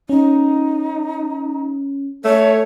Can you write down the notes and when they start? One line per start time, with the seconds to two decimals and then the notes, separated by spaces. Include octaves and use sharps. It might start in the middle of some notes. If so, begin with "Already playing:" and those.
0.09 C#4 D#4
2.25 A3 A4 C#5